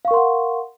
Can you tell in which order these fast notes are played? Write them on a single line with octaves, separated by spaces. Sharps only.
F5 C#6 A#4 C6 F#5